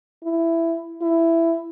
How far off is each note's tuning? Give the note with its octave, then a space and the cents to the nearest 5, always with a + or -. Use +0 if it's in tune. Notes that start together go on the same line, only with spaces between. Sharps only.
E4 +10
E4 +10